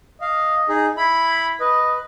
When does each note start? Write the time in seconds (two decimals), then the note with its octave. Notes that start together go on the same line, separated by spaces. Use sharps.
0.22 D#5 F5
0.69 D#4 G#4
0.97 E4 B5
1.60 B4 D#5